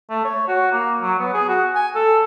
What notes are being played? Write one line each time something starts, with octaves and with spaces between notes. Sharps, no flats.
A3
C#5
F#4
A#3
F#3
B3
G#4
F#4
G#5
A4